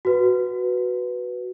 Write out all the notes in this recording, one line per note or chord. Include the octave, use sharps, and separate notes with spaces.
F#4 B4